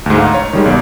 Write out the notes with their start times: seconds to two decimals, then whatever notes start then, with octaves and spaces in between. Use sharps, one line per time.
0.06 D2 G#2
0.18 F5 A#5
0.34 C#5
0.53 D#3 G3 G#3
0.65 B1